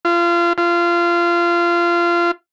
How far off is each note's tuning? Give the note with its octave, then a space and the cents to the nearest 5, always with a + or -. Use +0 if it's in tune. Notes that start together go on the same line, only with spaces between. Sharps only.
F4 -30
F4 -25